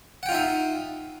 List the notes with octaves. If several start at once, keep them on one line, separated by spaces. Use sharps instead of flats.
D#4 F4 E5 F#5 G5